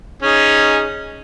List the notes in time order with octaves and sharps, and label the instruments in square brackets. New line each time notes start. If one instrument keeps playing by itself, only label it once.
[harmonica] C#4 D#4 G#4